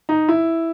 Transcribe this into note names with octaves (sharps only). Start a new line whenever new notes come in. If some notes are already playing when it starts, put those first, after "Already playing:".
D#4
E4